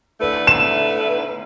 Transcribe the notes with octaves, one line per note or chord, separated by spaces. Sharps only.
D3 A3 E4 B4
E7